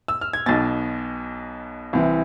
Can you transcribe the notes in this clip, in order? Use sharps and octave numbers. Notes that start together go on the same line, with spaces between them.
E6
F6
G#6
B1 B2 A6
C2 C3 E3